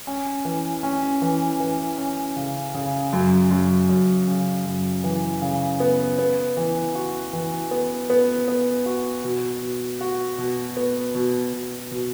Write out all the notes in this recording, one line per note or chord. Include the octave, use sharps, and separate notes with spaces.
C#4
E3
C#4
E3
E3
C#4
C#3
C#3
F#2
F#2
F#2
C#3
F#2
E3
C#3
B3
B3
E3
F#4
E3
B3
B3
B3
F#4
B2
B2
F#4
B2
B3
B2
B2
B2